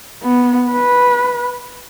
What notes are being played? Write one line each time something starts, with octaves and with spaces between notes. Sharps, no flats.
B3
B4